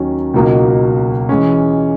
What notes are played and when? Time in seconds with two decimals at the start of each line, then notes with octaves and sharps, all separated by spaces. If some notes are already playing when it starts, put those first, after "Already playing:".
Already playing: D#2 D#3 F#3 C#4
0.34 C#2 B2 F#3 A#3 D#4
1.29 E3 G#3 C#4